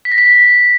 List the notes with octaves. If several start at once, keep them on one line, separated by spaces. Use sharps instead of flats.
B6
A#6
B6